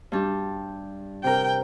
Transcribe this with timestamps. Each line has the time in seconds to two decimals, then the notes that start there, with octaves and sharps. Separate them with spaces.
0.12 G2 D4 G4
1.24 C3 A#4 G5